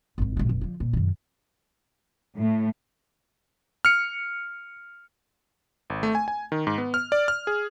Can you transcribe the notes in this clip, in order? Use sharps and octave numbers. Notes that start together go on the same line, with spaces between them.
G#1 D#4
A#1 G#2
F1
D3 F3
A#2
F#2 D#3
A2
F6 C#7
G#1
A3
G#5
G#5
D#3
G#2
B3
F6
D5
F6
G#4